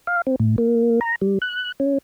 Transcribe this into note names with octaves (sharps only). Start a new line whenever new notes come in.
F5
C4
A2
A#3
A#5
G3
F#6
C#4